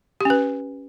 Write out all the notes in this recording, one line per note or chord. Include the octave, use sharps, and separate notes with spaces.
C#4 G4 B4